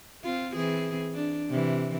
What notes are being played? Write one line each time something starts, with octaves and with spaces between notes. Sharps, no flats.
C4 F4
E3 C4 G#4
D4
C3 E3